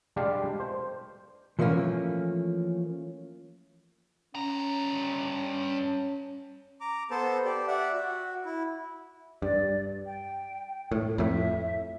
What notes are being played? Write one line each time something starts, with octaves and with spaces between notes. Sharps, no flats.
G3 G#3 D4 G4 F5 G5
C5
E3 F3 A3 A#3 C#4
G2 C#4 A#5
A#5 D6
B3 A4 C5 A5
G4 D5
D5 E5 F#5
F#4
E4
G2 D5
G5
A2
F2 A2 E5